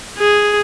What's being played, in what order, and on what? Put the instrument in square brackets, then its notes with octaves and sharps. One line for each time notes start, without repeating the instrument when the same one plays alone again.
[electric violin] G#4